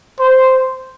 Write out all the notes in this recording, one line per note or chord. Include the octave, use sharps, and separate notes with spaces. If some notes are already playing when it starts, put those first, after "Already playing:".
C5